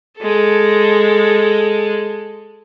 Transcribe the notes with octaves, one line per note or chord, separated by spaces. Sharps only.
G#3 A4